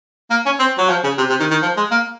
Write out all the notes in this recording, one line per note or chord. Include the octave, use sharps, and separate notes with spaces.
A#3
C#4
C4
F#3
F3
C#3
C3
C3
D#3
D#3
F3
G#3
A#3